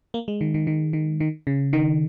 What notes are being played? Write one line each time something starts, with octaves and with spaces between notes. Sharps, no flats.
A#3
G#3
D#3
D#3
D#3
D#3
D#3
C#3
D#3